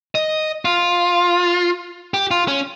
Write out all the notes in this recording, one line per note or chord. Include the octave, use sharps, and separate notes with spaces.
D#5
F4
G4
F4
C#4